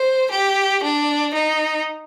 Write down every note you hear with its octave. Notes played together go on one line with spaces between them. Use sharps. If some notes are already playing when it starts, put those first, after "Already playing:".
Already playing: C5
G4
D4
D#4